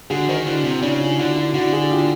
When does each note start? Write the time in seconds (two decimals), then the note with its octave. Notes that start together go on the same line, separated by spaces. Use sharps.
0.10 D3 F#4 G#4
0.28 D#3 A#4 C5
0.46 D3 E4 F#4
0.64 C3
0.82 C#3 D4 E4
1.00 D#4 F4
1.18 D3 E4 F#4
1.36 E4 F#4
1.54 D3 E4 F#4
1.72 F#4 G#4
1.91 F4 G4